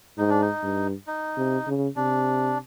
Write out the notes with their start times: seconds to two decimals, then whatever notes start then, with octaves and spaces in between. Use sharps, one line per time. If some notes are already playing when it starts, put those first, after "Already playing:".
0.17 G#2 D#4
0.30 D4
0.42 D#4
0.62 G2
1.07 D#4
1.37 C3
1.67 C#3
1.96 C3 D4